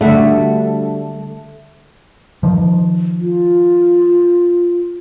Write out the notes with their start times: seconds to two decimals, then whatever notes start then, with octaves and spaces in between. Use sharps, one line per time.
0.01 D3 G3 A3 F#4 E5
2.43 D#3 F3
3.20 F4